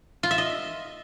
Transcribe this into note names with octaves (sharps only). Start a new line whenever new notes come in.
F4
E5
D#5